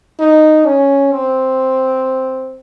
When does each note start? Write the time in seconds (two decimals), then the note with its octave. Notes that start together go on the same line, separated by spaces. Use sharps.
0.20 D#4
0.66 C#4
1.13 C4